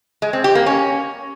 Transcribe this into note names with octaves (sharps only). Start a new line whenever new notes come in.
G#3
C4
G4
A#3
C#4